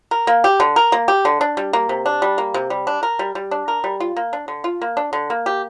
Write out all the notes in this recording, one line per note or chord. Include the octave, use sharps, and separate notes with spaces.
A#4
A#3
G4
D3
A#4
A#3
G4
D3
D4
G3
A#3
C3
D4
G3
A#3
C3
G3
D4
A#4
G3
G3
D4
A#4
G3
F4
A#3
D4
D3
F4
A#3
D4
D3
A#3
G4